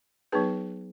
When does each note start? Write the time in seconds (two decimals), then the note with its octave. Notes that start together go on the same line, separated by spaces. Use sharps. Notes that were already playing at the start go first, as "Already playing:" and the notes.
0.32 F#3 B3 D#4 G#4 B4